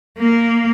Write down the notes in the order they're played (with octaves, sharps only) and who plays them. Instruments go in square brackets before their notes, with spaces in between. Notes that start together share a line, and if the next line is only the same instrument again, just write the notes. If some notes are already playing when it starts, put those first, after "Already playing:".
[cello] A#3